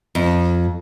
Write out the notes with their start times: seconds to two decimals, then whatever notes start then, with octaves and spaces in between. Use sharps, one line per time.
0.15 F2